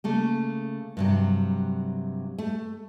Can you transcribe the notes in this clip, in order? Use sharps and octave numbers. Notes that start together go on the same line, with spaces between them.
C#3 A3 A#3
G2 C3 F#3
A3